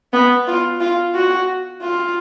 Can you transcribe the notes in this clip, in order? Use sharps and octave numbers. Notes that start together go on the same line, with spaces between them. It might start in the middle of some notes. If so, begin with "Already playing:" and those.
B3
F4
F4
F#4
F4